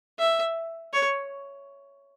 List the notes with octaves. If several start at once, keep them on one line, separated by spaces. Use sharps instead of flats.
E5
C#5